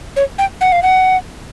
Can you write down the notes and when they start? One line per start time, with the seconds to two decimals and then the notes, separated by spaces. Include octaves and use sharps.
0.16 C#5
0.38 G5
0.61 F#5
0.72 F5
0.83 F#5